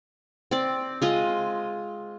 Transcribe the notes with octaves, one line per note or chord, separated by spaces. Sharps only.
C4 D5
G#3 F4 D#5